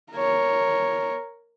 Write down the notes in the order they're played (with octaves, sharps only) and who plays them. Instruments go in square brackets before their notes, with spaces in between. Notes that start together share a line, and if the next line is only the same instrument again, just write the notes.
[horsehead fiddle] A#4 C#5